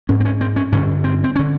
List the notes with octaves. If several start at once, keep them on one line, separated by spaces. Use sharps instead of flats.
G#2 C#4
C4
C#4
C4
C#4
G2 D3 C#4
C4
C4
C#4
D3